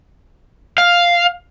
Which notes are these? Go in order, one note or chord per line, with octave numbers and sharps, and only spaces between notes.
F5